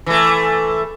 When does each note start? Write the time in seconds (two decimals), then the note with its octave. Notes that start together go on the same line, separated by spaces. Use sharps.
0.06 E3 A3